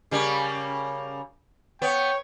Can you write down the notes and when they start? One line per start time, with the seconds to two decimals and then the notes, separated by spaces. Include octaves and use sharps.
0.11 C#3 G3 A#3
1.82 B3 C#5 G5